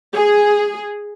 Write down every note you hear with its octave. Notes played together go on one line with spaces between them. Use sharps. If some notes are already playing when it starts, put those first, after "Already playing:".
G#4